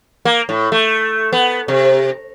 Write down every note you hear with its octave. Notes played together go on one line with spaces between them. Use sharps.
A#3
A2
A3
B3
C3